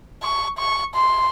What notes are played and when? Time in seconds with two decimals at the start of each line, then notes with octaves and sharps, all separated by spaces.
0.23 C#6
0.59 C#6
0.95 C6